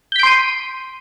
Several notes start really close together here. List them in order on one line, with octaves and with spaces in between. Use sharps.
G6 B6 D7 C6 D#7